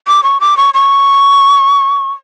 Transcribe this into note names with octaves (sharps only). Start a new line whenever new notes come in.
D6
C#6
D6
C#6
C#6